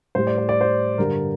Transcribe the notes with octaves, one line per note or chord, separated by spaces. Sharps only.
A2 G3 C5
D5
C5
D5
C5
G2 D3 G3 A#4